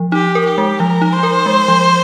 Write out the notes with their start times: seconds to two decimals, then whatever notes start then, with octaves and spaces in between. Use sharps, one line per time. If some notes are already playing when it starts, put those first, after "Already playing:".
Already playing: F3
0.12 D#4 G4
0.35 A#4
0.46 G4
0.58 G#3
0.79 F3 A#4
1.02 D#4
1.13 C5
1.23 A#4
1.46 G#3
1.68 F3